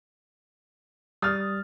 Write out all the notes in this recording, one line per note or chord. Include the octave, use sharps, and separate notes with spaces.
G3 D#6 F6 A6